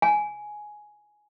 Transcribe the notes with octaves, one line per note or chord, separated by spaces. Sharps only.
G#5